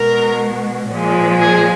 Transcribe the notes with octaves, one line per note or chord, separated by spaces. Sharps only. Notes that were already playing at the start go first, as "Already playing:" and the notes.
Already playing: B2 G#3 A#4
A#2 F3 G#3
G#4